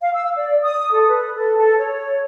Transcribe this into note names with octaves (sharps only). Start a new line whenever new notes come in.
F5
E6
D5
D#6
A4
B4
A4
A4
C#5